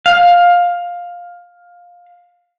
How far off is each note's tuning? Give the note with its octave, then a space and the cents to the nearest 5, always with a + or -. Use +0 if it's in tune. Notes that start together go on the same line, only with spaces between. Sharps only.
F5 +15